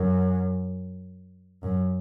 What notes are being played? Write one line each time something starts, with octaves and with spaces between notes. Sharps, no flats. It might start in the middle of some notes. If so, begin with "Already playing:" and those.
Already playing: F#2
F#2